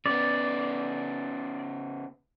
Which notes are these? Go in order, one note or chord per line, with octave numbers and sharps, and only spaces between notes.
C#3 B3 D5